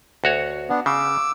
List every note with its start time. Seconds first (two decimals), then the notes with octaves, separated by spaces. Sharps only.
0.24 D2 F#4 C#5
0.69 B3 D4
0.86 C#3 D6 E6